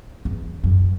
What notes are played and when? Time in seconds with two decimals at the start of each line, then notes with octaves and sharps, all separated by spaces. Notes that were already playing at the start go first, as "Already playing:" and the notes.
0.25 E2
0.64 F#2